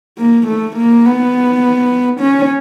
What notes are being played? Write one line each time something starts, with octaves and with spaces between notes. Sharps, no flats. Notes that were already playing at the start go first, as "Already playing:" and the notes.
A#3
A3
A#3
B3
C#4